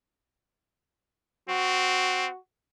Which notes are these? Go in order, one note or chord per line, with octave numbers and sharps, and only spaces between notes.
C4 F#4